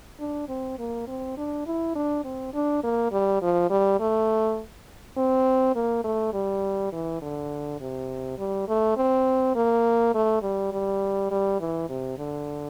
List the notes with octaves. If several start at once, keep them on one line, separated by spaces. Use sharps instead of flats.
D4
C4
A#3
C4
D4
E4
D4
C4
D4
A#3
G3
F3
G3
A3
C4
A#3
A3
G3
E3
D3
C3
G3
A3
C4
A#3
A3
G3
G3
G3
E3
C3
D3